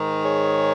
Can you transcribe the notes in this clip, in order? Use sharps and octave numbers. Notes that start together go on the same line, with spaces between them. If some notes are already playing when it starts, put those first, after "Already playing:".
Already playing: G#2 D#3
G#4 C#5